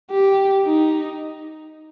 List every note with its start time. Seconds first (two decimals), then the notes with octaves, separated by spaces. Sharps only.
0.12 G4
0.66 D#4